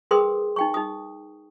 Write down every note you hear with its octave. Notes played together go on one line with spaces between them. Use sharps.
G#4 A#4 B4 G5 C6 D#6
D#4 G5 C#6
D#4 D#6